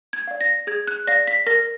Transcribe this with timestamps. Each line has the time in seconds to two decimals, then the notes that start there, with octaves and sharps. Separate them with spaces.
0.13 G#6
0.27 D5 F5
0.41 A#6
0.67 G#4 G#6
0.87 F#6
1.07 D5 F5 A#6
1.27 B6
1.47 A#4 A#6